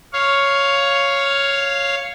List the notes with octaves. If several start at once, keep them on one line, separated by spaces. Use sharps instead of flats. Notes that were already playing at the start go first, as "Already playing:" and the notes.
C#5 F5